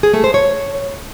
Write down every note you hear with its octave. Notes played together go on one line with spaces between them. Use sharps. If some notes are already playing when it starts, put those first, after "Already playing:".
G#4
A3
C5
C#5